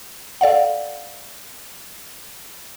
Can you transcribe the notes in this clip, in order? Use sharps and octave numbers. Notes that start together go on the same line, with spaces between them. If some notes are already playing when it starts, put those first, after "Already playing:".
A4 D5 F5 F#5